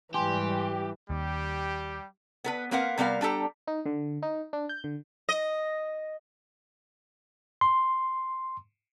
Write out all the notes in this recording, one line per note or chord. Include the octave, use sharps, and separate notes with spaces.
G#2 E3 G3 G4 G#5 C6
D#2 G3 G4
B3 A#4 B4
A#3 C4 A#4 B4 F5 F#5
C3 G3 B3 A#4 F5
G3 D4 G4 A4 A#5
D#4
D3
D#4
D4
G6
D3
D#5
C6